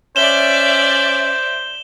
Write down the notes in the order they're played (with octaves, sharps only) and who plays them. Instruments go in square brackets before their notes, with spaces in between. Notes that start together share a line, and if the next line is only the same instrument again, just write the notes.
[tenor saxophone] C#4 [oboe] C5 [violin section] D5 E5 [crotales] E7 G7